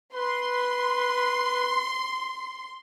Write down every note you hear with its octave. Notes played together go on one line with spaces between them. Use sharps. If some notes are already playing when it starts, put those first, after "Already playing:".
B4 C6